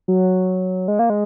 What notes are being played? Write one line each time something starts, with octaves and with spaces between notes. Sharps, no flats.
F#3
G#3
A#3
G#3